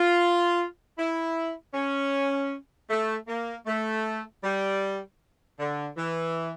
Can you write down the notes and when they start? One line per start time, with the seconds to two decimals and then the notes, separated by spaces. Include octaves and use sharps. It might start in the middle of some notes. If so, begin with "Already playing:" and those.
Already playing: F4
0.98 E4
1.74 C#4
2.90 A3
3.28 A#3
3.67 A3
4.44 G3
5.60 D3
5.97 E3